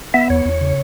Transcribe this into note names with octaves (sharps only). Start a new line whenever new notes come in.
B3 E5
E2 C#5
E2
C#3